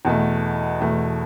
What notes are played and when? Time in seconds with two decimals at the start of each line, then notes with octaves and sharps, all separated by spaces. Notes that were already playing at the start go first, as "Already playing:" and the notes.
0.05 E2 B2 A3
0.80 E2 B2 A3